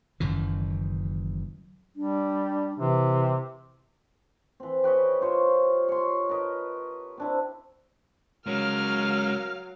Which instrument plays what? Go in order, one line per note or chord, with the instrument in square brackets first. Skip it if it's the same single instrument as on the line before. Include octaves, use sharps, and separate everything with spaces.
[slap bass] F#1 F#2 D#3 E3
[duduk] G3 [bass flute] D4
[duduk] C3 [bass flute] E3
[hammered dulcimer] E3 C4
G4 B4 C#5 D#5
F4 C5 C#5
C#5 C6
A#4 B4 D#5
C4 D4 E4
[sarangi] F#3 [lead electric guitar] G#3 C#4 [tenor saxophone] A#4 [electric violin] F5 F6